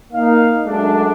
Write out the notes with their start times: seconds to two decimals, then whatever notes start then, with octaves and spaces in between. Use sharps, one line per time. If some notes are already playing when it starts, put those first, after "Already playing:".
0.13 A#3 D#4 F5
0.66 F#2 G#3 A3 D4